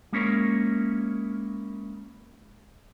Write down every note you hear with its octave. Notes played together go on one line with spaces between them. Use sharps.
G#3 A#3 C#4 E4 A#4 C#5